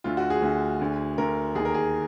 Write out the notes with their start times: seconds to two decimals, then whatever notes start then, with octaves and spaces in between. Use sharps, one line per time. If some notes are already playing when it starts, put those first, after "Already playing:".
0.04 D2 D3 F4
0.17 F#4
0.30 G#4
0.42 D2 D3
0.80 D2 D3
1.18 D2 D3 A#4
1.55 D#2 D#3 G#4
1.65 A#4
1.74 G#4